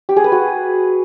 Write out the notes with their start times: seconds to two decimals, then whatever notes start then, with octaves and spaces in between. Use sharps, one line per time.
0.09 G4
0.16 G#4
0.24 B4
0.32 F#4